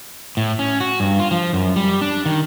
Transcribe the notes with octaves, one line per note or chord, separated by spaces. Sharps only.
A2
C#4
F#4
G2
F4
F3
F#2
G3
D4
D#3